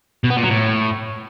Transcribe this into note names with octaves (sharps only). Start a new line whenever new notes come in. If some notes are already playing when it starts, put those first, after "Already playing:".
B2
B3
A#2
F#3
A2